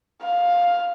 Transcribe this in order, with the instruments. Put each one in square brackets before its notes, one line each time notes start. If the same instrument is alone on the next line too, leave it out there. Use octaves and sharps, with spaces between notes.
[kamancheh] F5